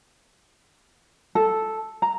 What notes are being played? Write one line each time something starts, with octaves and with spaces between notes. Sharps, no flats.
A4
A#5